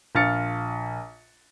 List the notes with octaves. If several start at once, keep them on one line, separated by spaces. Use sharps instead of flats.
A#1 F4 F6 A6 C#7